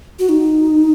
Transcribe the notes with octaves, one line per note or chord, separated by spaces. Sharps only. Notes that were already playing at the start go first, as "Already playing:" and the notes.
F#4
D#4